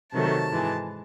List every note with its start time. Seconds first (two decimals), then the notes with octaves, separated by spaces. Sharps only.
0.13 C3 D#3 F#3 A3 A5
0.52 G#2 E3 G#3